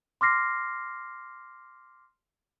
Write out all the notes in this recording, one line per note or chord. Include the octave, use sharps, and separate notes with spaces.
C6 D6 F6 A#6 C7